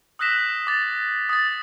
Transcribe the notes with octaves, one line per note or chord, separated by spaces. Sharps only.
D#6 E6 F#6 A#6 B6 E7
D6 A6
D#6 A6